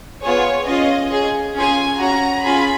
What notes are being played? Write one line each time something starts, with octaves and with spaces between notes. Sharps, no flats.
B3 F4 G#4 C#5
C#4 F4 G#4 D#5
C#4 G#4
C#4 F4 G#4 G#5
C#4 F#4 A#5
C#4 F4 G#4 B5